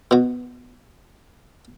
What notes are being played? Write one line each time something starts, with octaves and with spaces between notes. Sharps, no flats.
B2 F#4